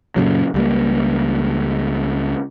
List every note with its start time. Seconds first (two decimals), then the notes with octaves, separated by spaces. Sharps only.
0.16 F#2 A#2 C#3 F#3
0.54 C#2 G3 A#3